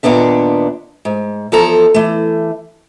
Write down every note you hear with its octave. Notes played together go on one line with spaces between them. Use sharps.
D#2 A#2 B3 D4 E5
G#2
E2 F3 A4 A#5
E3 A3